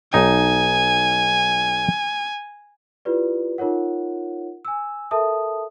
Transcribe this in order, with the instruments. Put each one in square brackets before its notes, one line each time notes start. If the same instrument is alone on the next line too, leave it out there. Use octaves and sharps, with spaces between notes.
[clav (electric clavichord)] B1 D#4 G5 [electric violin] G#5
[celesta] E4 F4 G4 B4 D5
D#4 F4 A#4 C#5 F#5
G#5 E6
A4 A#4 E5 A5 D#6